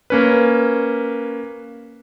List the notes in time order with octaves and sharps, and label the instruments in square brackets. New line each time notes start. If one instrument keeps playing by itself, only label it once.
[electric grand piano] A#3 C#4 B4